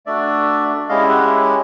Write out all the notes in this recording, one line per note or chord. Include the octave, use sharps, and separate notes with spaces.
A3 D4 F#4 D5 E5
G#3 C#4 E4 G4 D#5 F5
E5 F#5